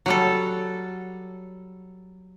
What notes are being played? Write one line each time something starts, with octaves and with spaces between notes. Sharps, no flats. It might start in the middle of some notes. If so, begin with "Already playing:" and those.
F#3 G3 A4